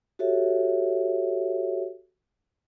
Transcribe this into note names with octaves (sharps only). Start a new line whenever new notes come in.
F#4 G4 A4 C#5 E5